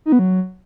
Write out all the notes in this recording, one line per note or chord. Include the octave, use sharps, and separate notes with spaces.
D#4
B3
F#3